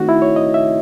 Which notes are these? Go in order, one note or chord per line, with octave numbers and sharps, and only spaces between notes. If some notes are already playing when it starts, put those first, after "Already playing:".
Already playing: D#3 A3 C4 D#4 F#4
E4
C#5
D#5
E5